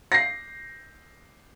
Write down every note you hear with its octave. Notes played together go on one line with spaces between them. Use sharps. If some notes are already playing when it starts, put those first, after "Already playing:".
A#6 C7